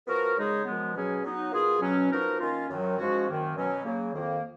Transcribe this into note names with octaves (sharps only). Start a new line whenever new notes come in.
F3 B3 F#4 A#4
C#3 G#3 D#4 G#4
F#2 F3 G#3 B3
B2 F#3 C#4 G#4
F#3 B3 D#4
B2 A#3 F4 G#4
B2 F#3 C#4
F3 B3 D#4 F#4 A#4
D#3 A#3 C#4 F4
F#2 D#3 F#3
G#2 F3 G#3 C#4 F#4
F#2 D#3 A#3
B2 F#3 C#4
C#3 F#3 A#3
F2 D#3 A#3